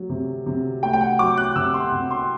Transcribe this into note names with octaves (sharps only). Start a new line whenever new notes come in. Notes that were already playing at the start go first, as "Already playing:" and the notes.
Already playing: F#3 A3
C3
C3
A3 G5
G5
F#5
F#3 D6
F#6
C3 E6
C6
C3
C6